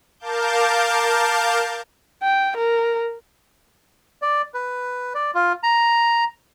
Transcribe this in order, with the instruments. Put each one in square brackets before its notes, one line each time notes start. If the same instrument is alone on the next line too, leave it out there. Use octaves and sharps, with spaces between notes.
[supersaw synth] A#4 F5 A5 D6 G6
[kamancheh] G5
A#4
[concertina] D5
B4
D5
F4
A#5